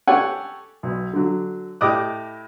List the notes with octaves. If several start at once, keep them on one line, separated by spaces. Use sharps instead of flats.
G4 A4 C#5 F#5 G#5
B1
D3 F#3
A2 G4 D#5 D6 D#6 F#6